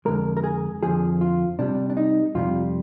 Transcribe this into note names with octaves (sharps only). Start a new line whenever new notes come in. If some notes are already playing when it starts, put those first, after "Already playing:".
F2 D3 G#3 A#4
A#4
G#4
F2 D3 F3 G#4
F4
C3 G3 D4
D4
D#4
F2 C3 G3 F4